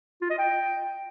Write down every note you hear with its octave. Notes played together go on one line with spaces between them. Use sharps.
F4
D#5
G5